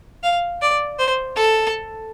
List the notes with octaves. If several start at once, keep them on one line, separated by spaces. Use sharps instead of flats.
F5
D5
C5
A4